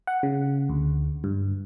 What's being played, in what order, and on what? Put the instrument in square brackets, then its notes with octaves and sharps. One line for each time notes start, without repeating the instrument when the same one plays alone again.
[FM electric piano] F#5
C#3
D2
G2